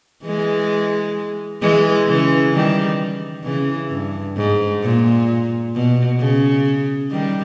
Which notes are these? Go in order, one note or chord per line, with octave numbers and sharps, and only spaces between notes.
E3 G#3
E3 G#3
C#3 E3
D#3 G3
C#3 E3
G2
G#2
A#2
B2
C#3
D#3 G3